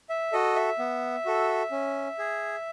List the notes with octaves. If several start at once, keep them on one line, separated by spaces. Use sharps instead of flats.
E5
F#4 A4 D#5
E5
B3
F#4 A4
C#4
G#4